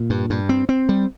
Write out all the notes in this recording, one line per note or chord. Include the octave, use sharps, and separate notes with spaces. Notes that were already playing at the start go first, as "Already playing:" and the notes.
Already playing: A#2
G2
G2
C4
C4
G3